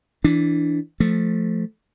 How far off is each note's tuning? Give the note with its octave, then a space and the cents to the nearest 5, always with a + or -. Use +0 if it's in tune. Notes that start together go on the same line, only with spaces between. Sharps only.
E3 +0 D4 -5
F3 +0 A3 +0